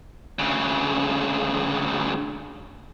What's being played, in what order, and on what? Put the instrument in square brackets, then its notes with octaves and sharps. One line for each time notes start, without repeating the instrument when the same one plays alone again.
[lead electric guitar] D2 C#3